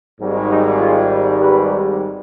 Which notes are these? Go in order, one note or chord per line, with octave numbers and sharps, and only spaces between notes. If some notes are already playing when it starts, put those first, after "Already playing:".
G#1 G#2 D#3 G3
D#4 G4
F4 G#4
G4 B4